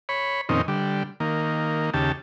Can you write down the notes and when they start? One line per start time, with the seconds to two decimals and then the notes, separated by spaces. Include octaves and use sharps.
0.09 C#5 B5
0.49 F2 A#2 D#3 C4 C#4 D#4
0.68 D3 G3
1.20 D#3 A#3
1.94 D#2 C#3 G4 A5